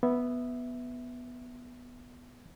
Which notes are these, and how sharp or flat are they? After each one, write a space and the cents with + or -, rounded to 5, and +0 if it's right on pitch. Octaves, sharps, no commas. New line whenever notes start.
B3 +0 E5 +0